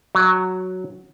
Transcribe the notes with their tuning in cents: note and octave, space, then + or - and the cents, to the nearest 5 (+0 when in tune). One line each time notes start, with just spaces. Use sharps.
F#3 +0